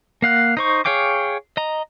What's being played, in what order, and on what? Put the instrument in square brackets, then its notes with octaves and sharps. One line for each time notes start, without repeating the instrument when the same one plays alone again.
[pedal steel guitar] A#3 F5 F#5
D#4 C5 C#6
G#4 C#5 F5 G5 D6
D#5 A#5